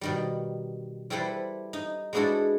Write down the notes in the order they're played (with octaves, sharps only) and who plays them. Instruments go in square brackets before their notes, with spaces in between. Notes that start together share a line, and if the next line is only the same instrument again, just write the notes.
[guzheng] B2 D#3 G3
G3 E4 G4 A4 B4 C5
D#4
G#3 B3 D4 E4 F#4 A4